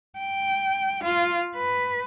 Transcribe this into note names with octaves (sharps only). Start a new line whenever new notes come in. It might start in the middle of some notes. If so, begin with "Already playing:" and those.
G5
F4
B4